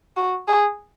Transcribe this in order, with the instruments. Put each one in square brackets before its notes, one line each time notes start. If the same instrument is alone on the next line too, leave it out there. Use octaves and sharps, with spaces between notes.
[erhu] F#4
G#4